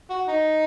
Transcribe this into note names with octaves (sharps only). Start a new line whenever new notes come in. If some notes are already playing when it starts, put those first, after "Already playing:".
F#4
D#4